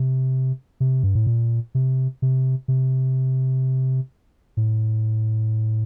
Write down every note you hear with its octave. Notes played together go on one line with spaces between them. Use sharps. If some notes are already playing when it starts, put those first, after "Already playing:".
Already playing: C3
C3
G2
A2
A#2
C3
C3
C3
A2